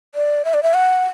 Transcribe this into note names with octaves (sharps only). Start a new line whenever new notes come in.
D5
E5
D5
E5
F#5